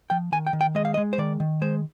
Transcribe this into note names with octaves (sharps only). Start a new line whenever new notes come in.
F3 G5
D#3 G#5
G5
D#3
G5
G#3 D#5
F5
D#5
G#3
C5
D#3 D5
D#3
G#3 C5